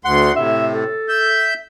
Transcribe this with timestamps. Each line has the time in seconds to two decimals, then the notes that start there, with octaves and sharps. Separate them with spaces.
0.05 D2 F#5 C6
0.36 A2 C3 E5
0.73 A4
1.09 E5 G6